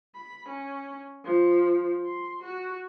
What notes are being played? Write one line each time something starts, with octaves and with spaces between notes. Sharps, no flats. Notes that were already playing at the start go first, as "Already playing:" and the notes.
B5
C#4
F3
C6
F#4